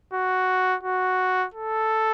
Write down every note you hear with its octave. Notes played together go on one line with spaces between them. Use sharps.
F#4
F#4
A4